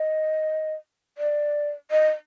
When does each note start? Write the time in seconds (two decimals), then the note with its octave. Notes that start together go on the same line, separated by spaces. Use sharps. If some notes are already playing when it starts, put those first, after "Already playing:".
Already playing: D#5
1.18 D5
1.91 D#5